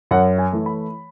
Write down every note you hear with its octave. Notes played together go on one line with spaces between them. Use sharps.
F#2 F#5
G#5
E3 A3
B5